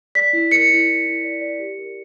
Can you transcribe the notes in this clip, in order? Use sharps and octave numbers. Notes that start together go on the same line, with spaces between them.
D5 B6
E4
A#4 C#7
E4
E4
E4
D5
D5
G4
A#4